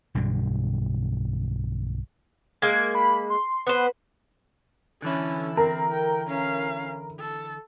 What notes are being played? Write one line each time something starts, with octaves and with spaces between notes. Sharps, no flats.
B1 G2 B2 D3
G#3 A#3 G#6
B5
C6
B3 B4 C5
D3 E3 C#4 E4 A4
C4 A#4
G5
C#4 F5
A4